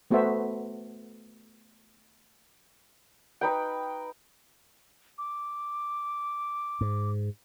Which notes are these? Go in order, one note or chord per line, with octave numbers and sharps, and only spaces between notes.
A3 B3 F#4 A4 C5 E5
D#4 B4 G5
D6
G#2